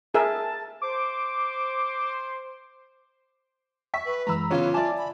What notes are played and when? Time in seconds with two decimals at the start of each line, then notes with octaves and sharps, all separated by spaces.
0.14 G#4 A#4 E5 A5
0.82 C5 D6
3.94 E5 C#6 B6
4.06 B4
4.27 F#2 E3 G#3 A#5 B5 E6
4.51 C#3 E3 B3 F4 C#5 F5
4.74 D5 E5 G#5 A5 D6
4.98 B5